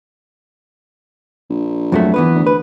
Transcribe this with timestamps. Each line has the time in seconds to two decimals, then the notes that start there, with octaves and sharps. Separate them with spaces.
1.50 A#1
1.92 F2 F#3 A3
2.14 E3 B3 B4
2.35 D2
2.47 B4